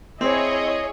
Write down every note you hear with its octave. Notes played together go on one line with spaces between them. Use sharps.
C4 E4 G#4 C#5 D#5